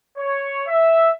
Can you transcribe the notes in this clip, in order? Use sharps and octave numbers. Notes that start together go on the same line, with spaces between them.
C#5
E5